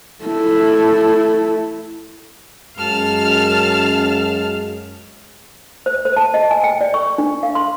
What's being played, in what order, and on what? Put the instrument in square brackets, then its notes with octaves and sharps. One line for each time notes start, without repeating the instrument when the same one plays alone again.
[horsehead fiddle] A3 E4
[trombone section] F#2 G#3 [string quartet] F5 A5 F6
[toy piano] C5
C5
A5
D#5
G#5
G5
D5
C#6
D4
F5
C6